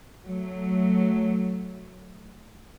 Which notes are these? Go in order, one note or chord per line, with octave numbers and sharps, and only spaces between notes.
F#3 A3